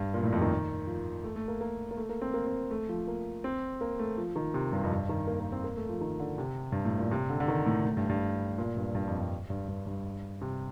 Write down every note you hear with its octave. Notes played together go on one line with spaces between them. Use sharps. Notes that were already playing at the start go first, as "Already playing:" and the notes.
Already playing: G2
A#2
A2
F2
D#3
F3
A3
A3
A#3
A#3
A#3
A3
A#3
C4
A#3
C4
A3
F3
A#3
C4
A#3
A3
F3
D#3
C3
G2
F2
G2
D#3
A#3
A#3
C4
A#3
A3
F3
D#3
D3
C3
G2
A2
A#2
C3
D3
D3
D#3
A2
A2
G2
G2
A#2
G2
G2
F2
G2
G2
G2
G2
C3